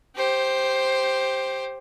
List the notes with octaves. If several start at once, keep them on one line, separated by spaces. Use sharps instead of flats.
G4 C5